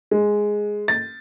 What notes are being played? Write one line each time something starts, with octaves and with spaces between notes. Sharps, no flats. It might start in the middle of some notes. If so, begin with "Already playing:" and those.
G#3
A6